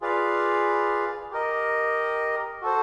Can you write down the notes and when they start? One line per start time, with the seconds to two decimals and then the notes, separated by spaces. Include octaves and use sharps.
0.01 F4 G#4 B4 D5 F5
1.31 G4 A#4 D#5
2.61 F#4 A4 C5